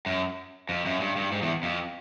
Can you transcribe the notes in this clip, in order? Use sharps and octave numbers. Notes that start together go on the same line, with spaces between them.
F#2
F2
F#2
G2
G2
G#2
E2
F2